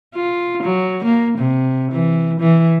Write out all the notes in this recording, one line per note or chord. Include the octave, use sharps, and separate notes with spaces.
F4
F#3
A#3
C3
E3
E3